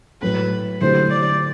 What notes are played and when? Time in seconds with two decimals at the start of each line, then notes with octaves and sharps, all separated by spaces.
0.22 A2 F#3 A3 B4
0.81 D3 F#3 A3 E4 G4 C5
1.11 D5